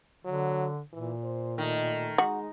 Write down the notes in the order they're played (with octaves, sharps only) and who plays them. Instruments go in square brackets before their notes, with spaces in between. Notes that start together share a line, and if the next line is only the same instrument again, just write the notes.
[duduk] D3 [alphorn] F#3
[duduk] A#2 [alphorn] E3
[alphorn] C5
[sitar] D#3 [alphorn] A3
[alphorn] G#3 [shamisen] F#4